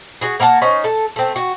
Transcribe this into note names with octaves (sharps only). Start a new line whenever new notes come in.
F#4 G#4
A#3 A#4 F#5 A5
C#4 D#4 C5
A4
A3 C4
F#4